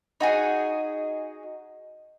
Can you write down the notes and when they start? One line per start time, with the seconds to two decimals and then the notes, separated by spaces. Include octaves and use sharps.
0.20 D#4 F#4 G#4